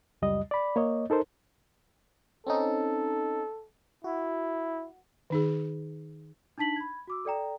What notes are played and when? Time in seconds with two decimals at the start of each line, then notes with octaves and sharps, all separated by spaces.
0.22 C#2 F#2 G3 D#5
0.51 D5 B5
0.76 A#3 C#5 D#5
1.10 D#4 A4 A#4 C5
2.47 C4 C#4 D#4 A4
4.04 E4 F#4
5.30 D#3 D#4 G#4
6.58 D4 D#4 A5 B6 F#7
6.76 B5 G#6
7.07 F#4 D6 E6
7.25 A4 D5 G5 A#5